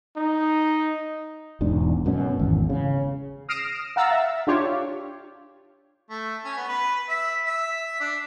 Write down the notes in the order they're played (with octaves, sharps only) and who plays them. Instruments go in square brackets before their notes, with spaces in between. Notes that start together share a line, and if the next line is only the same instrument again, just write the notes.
[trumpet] D#4
[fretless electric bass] E1 E2 G#2 D4
G1 F#2 B2 C#4
G#1 E2
C#3
[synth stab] D#6 F6 A#6 C7 D7 E7
F5 F#5 A#5 E6 A6
E5
D4 F4 G4 C#5
[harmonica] A3
C#4
B3
B4
E5
E5
D4